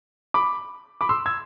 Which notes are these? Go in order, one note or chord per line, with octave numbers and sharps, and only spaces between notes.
B5 D6
B5 D6
C6 E6
E6 G#6